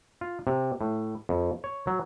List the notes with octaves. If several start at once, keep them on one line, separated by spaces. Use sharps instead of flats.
F4
C3
A2
F2
C#5
F#3